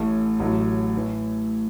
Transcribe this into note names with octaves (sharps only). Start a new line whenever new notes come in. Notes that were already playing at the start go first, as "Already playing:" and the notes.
Already playing: A1 A2 A3
A1 A2 F#3 A3
A2 E3